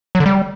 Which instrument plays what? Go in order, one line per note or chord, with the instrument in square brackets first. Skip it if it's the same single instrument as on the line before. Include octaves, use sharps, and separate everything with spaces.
[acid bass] F#3
D3
G3